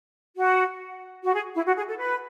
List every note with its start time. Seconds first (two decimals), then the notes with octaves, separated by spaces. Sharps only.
0.37 F#4
1.24 F#4
1.34 G#4
1.55 E4
1.67 F#4
1.77 G#4
1.88 A4
1.99 B4